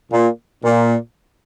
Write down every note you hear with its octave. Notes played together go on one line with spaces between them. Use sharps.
A#2
A#2